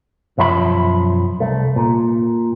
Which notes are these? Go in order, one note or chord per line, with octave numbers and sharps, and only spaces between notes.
B1 F#2 F3 E5 B5
C2 A3
A#2